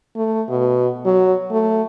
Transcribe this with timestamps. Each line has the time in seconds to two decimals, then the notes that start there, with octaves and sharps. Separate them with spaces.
0.16 A3
0.48 B2
1.05 F#3
1.51 A3